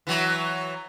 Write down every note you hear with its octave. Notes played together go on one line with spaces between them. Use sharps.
E3 F#3